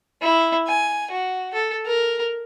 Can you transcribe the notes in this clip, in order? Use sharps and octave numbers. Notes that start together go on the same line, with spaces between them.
E4
G#5
F#4
A4
A#4